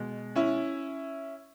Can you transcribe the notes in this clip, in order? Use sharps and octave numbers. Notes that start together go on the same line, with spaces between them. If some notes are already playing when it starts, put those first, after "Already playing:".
Already playing: B2 G#3
C#4 E4